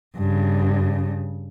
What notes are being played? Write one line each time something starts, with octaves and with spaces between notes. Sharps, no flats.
G2 C#3